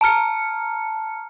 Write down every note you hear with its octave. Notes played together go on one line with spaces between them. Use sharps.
A5 A#5 F6 C#7